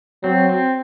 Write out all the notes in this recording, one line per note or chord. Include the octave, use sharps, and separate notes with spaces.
F#3 C4
C4